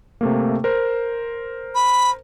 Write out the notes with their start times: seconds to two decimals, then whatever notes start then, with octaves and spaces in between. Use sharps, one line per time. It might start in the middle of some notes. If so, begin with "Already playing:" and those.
0.21 C3 A3 A#3
0.64 A#4 C5
1.75 B5